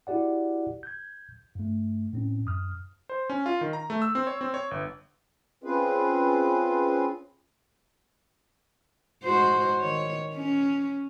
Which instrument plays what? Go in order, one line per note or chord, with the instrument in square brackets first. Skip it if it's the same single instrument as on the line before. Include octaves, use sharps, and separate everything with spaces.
[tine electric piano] E4 F#4 G4 D5 F#5
G6 G#6
G2 A3
A2 C4 C#4
F#2 D#6 F6
[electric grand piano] C5
C#4
F4
D#3
A#5
A3
E6
C4
C#5
C4
C#5
G1
[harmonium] C4 C#4 F4 G#4 B4
[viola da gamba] G#2 F#4 C5
D#3 C#5
C#4